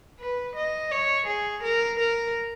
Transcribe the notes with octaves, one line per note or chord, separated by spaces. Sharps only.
B4
D#5
C#5
G#4
A#4
A#4